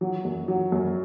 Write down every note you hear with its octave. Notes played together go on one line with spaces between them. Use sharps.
F#3
F#2
F#3
F#2